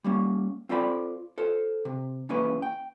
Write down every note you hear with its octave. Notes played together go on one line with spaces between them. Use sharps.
G3 A#3 C#4
C4 F4 A4 C5 D5 B5
A4 C5
C3
E2 A#3 C#4 E4 B4
G5